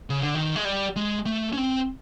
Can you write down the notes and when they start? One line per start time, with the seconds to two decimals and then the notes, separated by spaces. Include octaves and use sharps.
0.10 C#3
0.22 D3
0.34 D#3
0.56 G#3
0.65 G3
0.96 G#3
1.26 A3
1.53 C#4
1.58 C4